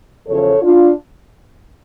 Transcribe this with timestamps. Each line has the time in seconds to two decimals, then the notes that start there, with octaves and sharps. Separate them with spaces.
0.28 E2 C#3 F3 A4 C#5
0.61 D4 F4